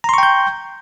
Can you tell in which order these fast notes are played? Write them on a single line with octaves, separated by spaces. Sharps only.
A#5 C6 C#6 G5 G6